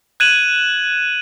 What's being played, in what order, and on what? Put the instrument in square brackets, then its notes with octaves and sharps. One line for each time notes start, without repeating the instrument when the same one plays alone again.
[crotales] F#6 G#6 D#7 E7 F#7